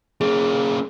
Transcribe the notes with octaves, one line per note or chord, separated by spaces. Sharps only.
A#3 C#4 G#4